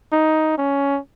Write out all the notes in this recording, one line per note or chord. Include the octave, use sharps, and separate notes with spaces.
D#4
C#4